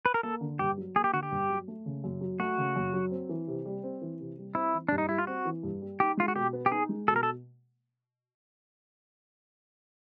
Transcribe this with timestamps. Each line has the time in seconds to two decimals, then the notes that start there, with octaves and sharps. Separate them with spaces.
0.06 B4
0.14 A#4
0.23 A#3 A4
0.41 D3
0.59 G2 G4
0.77 F#3
0.95 A#3 G#4
1.04 G4
1.13 D3 F#4
1.23 G4
1.31 G2
1.49 F#3
1.68 A3
1.86 C#3
2.04 F#2
2.21 F#3
2.40 A3 F#4
2.58 C#3
2.76 F#2
2.93 F#3
3.11 C4
3.29 E3
3.48 C3
3.65 G3
3.83 C4
4.02 E3
4.20 C3
4.38 G3
4.55 C4 E4
4.73 E3
4.88 G2 D4
4.98 D#4
5.09 G3 E4
5.18 F4
5.27 C4 F#4
5.45 E3
5.63 G2
5.81 G3
6.00 D#4 G4
6.17 G#3 F4
6.28 F#4
6.36 B2 G4
6.53 B3
6.66 G4
6.71 D#4 G#4
6.89 G#3
7.08 B2 A4
7.16 A#4
7.23 A4